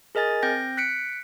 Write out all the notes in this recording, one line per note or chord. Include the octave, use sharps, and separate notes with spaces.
G#4 A#4 D#5 G#5 A6
C4 G5 G6 A#6
F#6 B6 C#7 D7